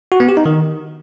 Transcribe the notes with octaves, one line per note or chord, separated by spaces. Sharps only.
F#4
B3
G4
D#4
D#3